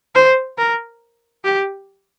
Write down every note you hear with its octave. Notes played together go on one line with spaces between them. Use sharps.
C5
A#4
G4